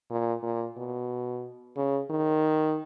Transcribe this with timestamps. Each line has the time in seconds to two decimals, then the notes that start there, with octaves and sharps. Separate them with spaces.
0.10 A#2
0.43 A#2
0.77 B2
1.76 C#3
2.10 D#3